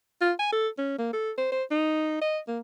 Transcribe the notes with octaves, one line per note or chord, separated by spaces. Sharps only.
F4
G#5
A4
C#4
A#3
A4
C5
C5
D#4
D#5
A#3